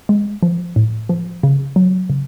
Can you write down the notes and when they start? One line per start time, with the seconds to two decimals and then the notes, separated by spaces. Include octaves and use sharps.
0.09 G#3
0.43 F3
0.76 A2
1.09 F3
1.43 C#3
1.76 F#3
2.10 C#3